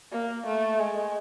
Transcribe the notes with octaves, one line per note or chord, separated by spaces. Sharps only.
A#3
A3
G#3